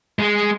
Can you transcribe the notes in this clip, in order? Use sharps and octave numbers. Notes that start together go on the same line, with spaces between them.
G#3